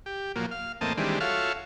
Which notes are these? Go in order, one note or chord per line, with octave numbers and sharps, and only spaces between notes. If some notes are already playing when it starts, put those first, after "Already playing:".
G4
A#2 F3 F#3 A#3
F5
E2 A2 A#3 C4 D#5 A5
D#3 E3 G3 G#3 C4 D4
F4 F#4 A4 C#5 E5 F5